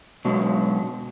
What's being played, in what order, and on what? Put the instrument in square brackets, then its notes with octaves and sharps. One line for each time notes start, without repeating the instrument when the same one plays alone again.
[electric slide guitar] B2 F#3 G#3